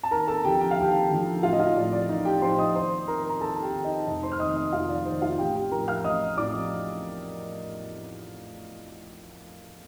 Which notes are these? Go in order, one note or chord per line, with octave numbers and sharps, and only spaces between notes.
A5
D#2 A#4 A#5
A4 A5
D3 F3 G4 G5
G5
F5
D#2 G4 G5
D3 F3
A1 F4 F5
D#5
F4 F5
A2 F3 D5
D5
A1 D#4 D#5
G4 G5
A2 F3 C5 C6
D#5 D#6
D#2 C5 C6
D#3 A#4 A#5
A#5
D#2 A4 A5
G4 G5
D#3
D#4 D#5
F1 D#4 D#5
C5 C6
F6
D#2 D#3 D#5 D#6
D#5 D#6
F1 F4 F5
D5
D#2 D#3 C5
F4 F5
A1 G4 G5
G4 G5
A2 F3 A#4 A#5
F5 F6
A1 D#5 D#6
A2 F3 D5 D6